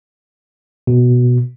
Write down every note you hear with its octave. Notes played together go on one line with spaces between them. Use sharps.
B2